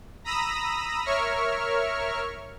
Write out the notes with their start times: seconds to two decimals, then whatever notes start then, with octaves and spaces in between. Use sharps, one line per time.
0.24 A#5 B5 D#6 E6 A#6
1.05 A#4 C#5 E5 C#6 F6